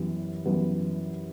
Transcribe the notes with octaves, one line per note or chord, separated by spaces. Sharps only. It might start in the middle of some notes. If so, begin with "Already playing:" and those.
Already playing: F#2 E3 G3 B3
F#2 E3 G3 B3